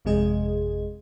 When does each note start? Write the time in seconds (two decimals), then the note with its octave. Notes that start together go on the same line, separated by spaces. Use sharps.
0.05 G#1 F2 C3 G#3 G#4 D#5